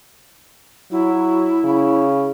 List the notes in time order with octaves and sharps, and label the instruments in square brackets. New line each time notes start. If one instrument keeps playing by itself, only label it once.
[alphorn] F#3 [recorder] E4
[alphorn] C#3